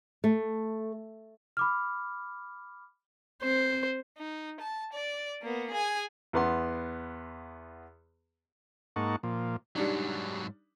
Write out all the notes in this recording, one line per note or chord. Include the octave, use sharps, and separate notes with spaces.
A3
B5 D6 F6
C4 C5
D#4
A5
D5
A#3 B3
G#4 G#5
E2 B3 C6
G#2 A#3 D#4 F#5 A5 C#6
A#2 F3
G#2 F#3 G3 D4 D#4